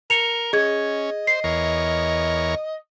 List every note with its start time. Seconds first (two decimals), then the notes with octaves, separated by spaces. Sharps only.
0.10 A#4 C#7 F7
0.53 C#4 G#4 D#5 G#6
1.27 C5 C7
1.44 E2 A#4 C#5